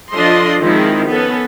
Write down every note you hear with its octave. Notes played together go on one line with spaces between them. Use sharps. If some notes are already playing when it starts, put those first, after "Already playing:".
F3 D4 F4 A4 D#5 C6
D#3 F3 G#3 C4 E4
B3 C#4 A4